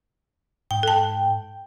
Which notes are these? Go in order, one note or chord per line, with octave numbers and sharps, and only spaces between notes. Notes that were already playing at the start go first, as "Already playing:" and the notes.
G#2 G5
A4 A5